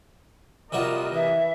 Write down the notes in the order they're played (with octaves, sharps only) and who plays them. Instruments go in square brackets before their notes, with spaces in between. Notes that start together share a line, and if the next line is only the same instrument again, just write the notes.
[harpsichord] C3 G3 F#4 [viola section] F4 A#4 D#5
[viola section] E3 [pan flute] E5